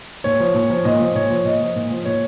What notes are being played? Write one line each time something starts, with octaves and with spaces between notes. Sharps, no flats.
A#2 C#5
F3
A#2
F3
A#2 D#5
F3
A#2 C#5
F3
A#2 D#5
F3
A#2
F3
A#2 C#5